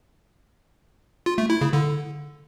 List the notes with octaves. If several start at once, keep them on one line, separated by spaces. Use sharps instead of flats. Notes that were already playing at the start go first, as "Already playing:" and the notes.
F4
A3
E4
C#3
D3